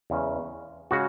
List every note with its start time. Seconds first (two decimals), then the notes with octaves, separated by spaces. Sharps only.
0.10 E2 C#3 G#3 C#4
0.91 C#3 G#3 C#4 F#4